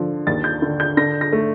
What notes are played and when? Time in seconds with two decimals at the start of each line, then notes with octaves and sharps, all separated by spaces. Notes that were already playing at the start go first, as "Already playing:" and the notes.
Already playing: D3 F3
0.27 D#2 A6
0.44 G6
0.62 D3
0.80 G6
0.97 D3 A#6
1.21 A#6
1.32 A3